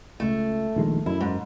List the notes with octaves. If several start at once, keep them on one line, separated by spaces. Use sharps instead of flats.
C#2 A3
A#1 D#3 G#3
F#2 E4
G#2